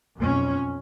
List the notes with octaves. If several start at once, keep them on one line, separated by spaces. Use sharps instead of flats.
B1 F2 C#4